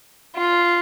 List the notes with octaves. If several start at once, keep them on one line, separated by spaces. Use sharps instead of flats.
F4